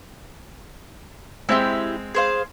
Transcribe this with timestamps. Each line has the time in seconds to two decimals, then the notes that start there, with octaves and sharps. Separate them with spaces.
1.49 G#3 C4 E4 G4 E5
2.15 G#4 C5 F5